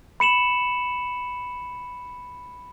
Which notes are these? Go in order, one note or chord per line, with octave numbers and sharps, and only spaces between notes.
B5 C#7 E7 F#7